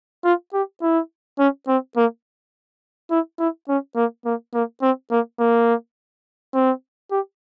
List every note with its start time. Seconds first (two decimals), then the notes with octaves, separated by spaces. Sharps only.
0.24 F4
0.54 G4
0.82 E4
1.39 C#4
1.68 C4
1.97 A#3
3.11 E4
3.39 E4
3.69 C#4
3.96 A#3
4.26 A#3
4.54 A#3
4.82 C4
5.11 A#3
5.40 A#3
6.54 C4
7.11 G4